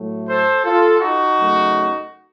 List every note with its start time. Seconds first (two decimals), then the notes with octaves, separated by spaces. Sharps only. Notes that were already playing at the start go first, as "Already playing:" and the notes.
Already playing: A2 F#3 A3
0.28 A4 C5
0.65 F4 A4
1.01 D#4 F#4
1.38 F#2 C#3 F#3 A3